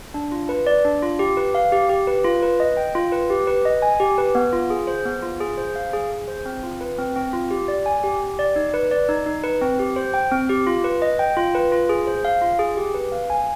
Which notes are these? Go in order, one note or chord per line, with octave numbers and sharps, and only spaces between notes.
D4
F4
B4
D5
D4
F4
G4
B4
F5
G4
G4
B4
F4
B4
D#5
G5
F4
B4
G4
B4
D#5
G#5
G4
B4
B3
F4
G#4
C5
B3
F4
G#4
C5
F5
G#4
G#4
C5
C4
F4
B4
C4
C4
F4
G4
D5
G#5
G4
G4
D5
D#4
B4
D5
D#4
D#4
B4
C4
G4
C5
G5
C4
G4
F4
B4
D#5
G5
F4
B4
F4
G#4
C5
F5
F4
G#4
G4
B4
F5
G#5